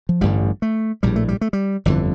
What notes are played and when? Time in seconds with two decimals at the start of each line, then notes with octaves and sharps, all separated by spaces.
0.09 F3
0.21 A1 G2 D3 G3
0.62 A3
1.03 A#1 A2 G3
1.16 A3
1.28 G3
1.41 A3
1.53 G3
1.85 G1 F2 D3 E3